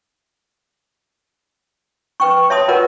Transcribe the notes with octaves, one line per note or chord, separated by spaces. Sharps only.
B4 G5 C#6
C#5 E5 A5 C6 D#6
F4 A#4 B4 C#5 D#5 F#5